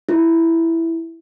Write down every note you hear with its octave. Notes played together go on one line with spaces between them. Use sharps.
E4